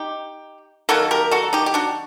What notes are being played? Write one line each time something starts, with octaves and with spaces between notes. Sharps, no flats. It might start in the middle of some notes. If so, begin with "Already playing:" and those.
Already playing: D#4 G4
D#3 F#3 A#3 F#4 A4
G4 A#4
F#4 A4
D#4 G4
G4
D4 F#4